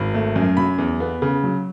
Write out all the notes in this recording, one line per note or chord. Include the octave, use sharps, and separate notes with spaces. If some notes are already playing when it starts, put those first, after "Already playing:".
Already playing: G#1 B5
A3
F#2
F#3 B5
E2
B3
C#3
F#3